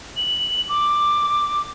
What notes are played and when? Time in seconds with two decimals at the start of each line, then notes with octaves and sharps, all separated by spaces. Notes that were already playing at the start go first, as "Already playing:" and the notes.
0.17 F#7
0.69 D6